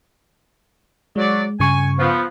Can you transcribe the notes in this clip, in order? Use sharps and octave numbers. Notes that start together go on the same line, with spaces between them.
F#3 G#3 D5
G2 C#3 G#5 C#6
F3 B3